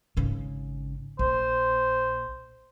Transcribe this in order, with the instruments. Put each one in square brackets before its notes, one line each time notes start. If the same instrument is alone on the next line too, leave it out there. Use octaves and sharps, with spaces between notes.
[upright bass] G#1 C#3
[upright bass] A#1 [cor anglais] C5